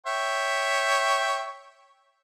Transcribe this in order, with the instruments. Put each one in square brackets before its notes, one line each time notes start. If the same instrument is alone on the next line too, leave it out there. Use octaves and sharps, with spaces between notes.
[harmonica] C#5 E5 G5